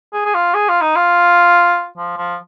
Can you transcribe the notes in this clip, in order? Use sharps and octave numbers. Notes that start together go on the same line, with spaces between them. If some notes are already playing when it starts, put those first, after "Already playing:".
G#4
G#4
F4
G#4
F4
D#4
F4
F3
F3